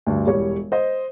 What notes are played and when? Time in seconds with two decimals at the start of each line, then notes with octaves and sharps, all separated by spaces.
0.07 D2 G2
0.27 E1 G3 C#5
0.72 C5 D#5